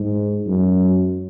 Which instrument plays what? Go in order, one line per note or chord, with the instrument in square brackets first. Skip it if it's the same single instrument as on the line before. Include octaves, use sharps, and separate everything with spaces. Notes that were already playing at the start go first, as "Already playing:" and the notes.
Already playing: [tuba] G#2
F#2